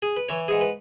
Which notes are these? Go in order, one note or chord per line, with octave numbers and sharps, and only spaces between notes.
G#4
B4
E3 C#5
G#2 G#4
B4